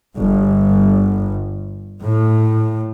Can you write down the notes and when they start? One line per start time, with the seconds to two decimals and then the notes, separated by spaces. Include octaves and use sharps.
0.16 G1
2.03 A2